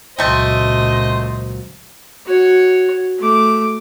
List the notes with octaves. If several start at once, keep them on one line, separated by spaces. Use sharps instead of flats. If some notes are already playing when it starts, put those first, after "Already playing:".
C#2 A#2 F#3 A3 C4 C5 D#5
F#4 C#5
A3 D6